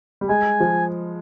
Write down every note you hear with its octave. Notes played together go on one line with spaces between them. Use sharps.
G3
G#3 G#5
F3